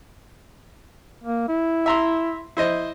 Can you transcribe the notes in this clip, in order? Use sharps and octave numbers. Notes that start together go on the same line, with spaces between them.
A#3
E4
E5 A#5 C6
E4 C5 D#5